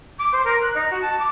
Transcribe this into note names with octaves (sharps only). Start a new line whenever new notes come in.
D6
C5
A#4
F#6
D#4
F#4
A5
D6